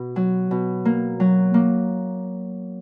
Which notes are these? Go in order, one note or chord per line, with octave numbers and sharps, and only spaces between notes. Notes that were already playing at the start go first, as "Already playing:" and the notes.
Already playing: B2
F#3
B2
A#3
F#3
A#3